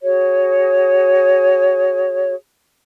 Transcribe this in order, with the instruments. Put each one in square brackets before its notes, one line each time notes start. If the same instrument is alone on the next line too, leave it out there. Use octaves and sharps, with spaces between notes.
[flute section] F#4 G#4 C#5